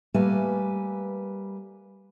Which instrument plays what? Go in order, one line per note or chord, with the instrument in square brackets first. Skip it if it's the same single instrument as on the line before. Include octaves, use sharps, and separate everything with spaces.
[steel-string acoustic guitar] G3 A3 A#3 B4 G#5